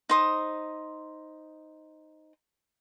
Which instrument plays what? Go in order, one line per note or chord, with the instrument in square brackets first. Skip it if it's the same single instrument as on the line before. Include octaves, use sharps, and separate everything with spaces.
[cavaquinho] D#4 C5 D#6